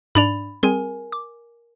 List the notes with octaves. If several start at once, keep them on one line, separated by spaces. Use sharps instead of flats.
G#2 D4 D5 B5 A6 F7
G3 C4 G#4 A#4 G#5
D6